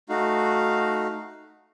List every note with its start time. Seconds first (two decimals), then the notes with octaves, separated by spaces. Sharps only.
0.09 A3 D#4 F#4 F5